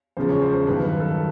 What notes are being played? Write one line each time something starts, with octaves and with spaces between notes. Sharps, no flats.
E2 C#3 F3 G#3 C5
C#5
C5
C5
G2 D#3 F#3 B4
B4
A4